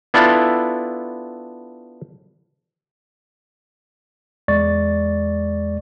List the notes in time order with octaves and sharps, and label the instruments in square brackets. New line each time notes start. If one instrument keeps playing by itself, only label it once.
[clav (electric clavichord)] B3 D4 E4 F4 A4
[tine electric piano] E2 G#3 D5 C#6 A6